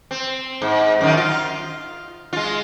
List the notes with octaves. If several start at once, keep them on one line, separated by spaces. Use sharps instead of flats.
C4
G#2
F#2 D#3
F4
G#3 F4